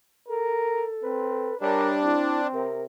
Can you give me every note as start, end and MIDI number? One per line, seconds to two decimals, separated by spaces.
0.28 1.54 69
0.28 0.86 70
1.04 1.51 60
1.04 1.59 71
1.61 2.17 55
1.61 2.47 62
1.61 1.89 70
1.61 1.98 73
2.04 2.70 60
2.04 2.40 64
2.53 2.86 48
2.53 2.83 70